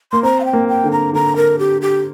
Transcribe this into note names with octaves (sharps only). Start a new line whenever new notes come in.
A#3 C6
C4 A#5
F5
G5
A#3
G5
D3
A#5
D3 A#5
A#4
G4
G4